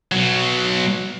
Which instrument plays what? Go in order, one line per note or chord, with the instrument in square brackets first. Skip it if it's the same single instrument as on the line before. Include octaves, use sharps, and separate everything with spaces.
[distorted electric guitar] B2 F#3